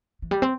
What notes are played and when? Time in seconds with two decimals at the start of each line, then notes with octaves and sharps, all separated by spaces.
0.22 E3
0.31 G3
0.42 C4